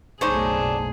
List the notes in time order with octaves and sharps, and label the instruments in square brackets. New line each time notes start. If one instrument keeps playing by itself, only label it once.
[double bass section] F#1 B1 A3 [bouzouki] D4 [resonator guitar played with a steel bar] D#4 C5 C#5 [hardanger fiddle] G#4